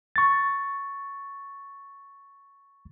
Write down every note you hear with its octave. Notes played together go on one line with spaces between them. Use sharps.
C#6 A6